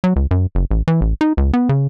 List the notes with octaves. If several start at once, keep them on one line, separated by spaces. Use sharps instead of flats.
F#3
C#2
F#2
F#1
A1
E3
A1
D#4
C#2
B3
C#3